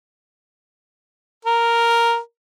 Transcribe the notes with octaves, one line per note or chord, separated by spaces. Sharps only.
A#4